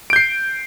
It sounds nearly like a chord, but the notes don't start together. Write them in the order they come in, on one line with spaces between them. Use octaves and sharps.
D7 G6 C7